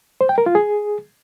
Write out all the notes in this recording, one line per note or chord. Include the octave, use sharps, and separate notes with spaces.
C5
G5
A#4
F4
G#4